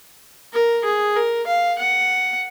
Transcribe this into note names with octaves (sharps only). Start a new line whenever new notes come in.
A#4
G#4
A#4
F5
F#5